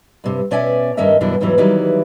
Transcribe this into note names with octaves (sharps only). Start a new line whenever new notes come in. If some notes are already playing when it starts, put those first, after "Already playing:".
G2 C3
B2 C#4 D5 E5 G#5
G2 D#3 C#4 A#4 D#5 E5
F#2 B2 E3 D4 E4
E2 G#2 C#3 E3 F#3
D#3 E3 F#3 G3 E4